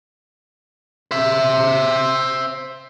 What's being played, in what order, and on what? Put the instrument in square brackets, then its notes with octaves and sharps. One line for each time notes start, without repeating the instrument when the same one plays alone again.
[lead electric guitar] C5 E5